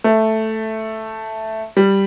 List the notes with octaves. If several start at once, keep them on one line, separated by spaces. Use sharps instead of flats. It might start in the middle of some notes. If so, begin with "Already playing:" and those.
A3
G3